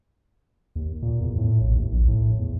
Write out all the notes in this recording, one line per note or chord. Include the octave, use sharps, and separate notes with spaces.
D#2
A#2
E2
A2
A#1
D#2
A#1
A2
E2